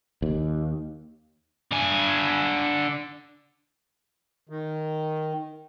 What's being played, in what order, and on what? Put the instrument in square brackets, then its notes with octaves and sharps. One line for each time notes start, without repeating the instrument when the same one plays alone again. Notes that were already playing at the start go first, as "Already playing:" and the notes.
[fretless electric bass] D#2
[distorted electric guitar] D3 G#5
[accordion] D#3